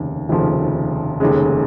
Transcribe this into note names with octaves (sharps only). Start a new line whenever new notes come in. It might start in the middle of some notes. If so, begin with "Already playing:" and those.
Already playing: F1 D#2 C#3
F1 D#2 C#3 F3
F1 D#2 C#3 G#3